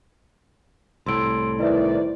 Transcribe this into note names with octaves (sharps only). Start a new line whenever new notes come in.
C2 A2 C6 E6 D7
D#3 E4 B4 C5 D5 E5